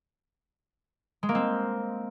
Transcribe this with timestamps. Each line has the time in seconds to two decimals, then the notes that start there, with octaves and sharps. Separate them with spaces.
1.23 G#3
1.29 A#3
1.35 C4